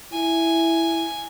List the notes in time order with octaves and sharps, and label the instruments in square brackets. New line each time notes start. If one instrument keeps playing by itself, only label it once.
[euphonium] E4 [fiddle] G#5